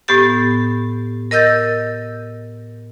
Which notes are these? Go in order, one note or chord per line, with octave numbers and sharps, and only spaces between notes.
A2 B3 G4 A6
A#4 D#5 E6 G6 A6